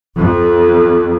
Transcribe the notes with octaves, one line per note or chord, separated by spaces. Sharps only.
F2